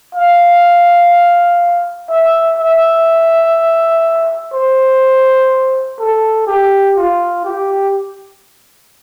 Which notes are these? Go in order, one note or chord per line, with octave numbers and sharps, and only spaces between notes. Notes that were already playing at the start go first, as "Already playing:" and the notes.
F5
E5
E5
C5
A4
G4
F4
G4